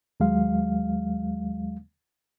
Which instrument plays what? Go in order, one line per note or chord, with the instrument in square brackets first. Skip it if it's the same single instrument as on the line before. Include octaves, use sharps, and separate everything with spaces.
[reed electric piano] D#2 F#3 G#3 F5